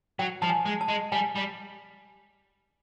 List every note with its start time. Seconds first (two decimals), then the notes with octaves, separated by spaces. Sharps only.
0.19 F#3 G5
0.42 F3 A5
0.49 G#5
0.66 G#3
0.81 A5
0.88 G#3
1.12 G3 G#5
1.35 G3